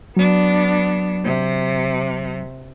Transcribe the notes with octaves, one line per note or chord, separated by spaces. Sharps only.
F#3 B3 D4
C3